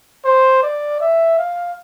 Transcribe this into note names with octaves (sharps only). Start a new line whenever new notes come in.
C5
D5
E5
F5